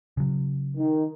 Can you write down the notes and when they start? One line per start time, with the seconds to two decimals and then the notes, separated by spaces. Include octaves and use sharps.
0.17 C#3 F#3
0.77 D#3